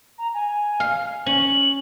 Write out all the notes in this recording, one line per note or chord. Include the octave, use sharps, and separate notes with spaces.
A#5
G#5
F5
C#4 F#7